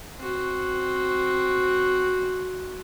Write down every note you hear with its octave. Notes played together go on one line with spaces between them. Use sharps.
C4 F#4